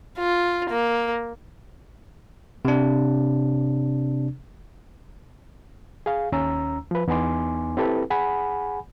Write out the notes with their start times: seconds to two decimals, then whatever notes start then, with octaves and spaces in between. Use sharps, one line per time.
0.19 F4
0.70 A#3
2.65 C3 D4
6.06 G#4 F5
6.32 D#2 C#4 A#5 E6
6.91 F3 B4
7.08 E2 B3 D#4 G#5 C6 D6
7.77 C4 E4 G4 A4 B4
8.10 G#4 F#5 G#5 B5